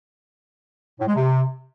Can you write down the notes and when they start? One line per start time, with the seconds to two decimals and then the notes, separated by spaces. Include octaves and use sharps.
0.99 A2
1.07 G#3
1.15 C3